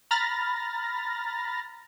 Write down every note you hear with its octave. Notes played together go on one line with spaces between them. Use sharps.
A#5 B5 F6 A6 A#6